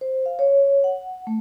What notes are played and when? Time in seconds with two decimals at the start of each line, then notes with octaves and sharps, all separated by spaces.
0.01 C5
0.26 F5
0.39 C#5
0.84 F#5
1.27 A3